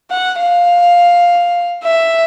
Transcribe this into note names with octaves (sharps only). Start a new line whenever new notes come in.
F#5
F5
E5